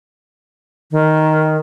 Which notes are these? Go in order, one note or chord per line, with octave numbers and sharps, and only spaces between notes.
D#3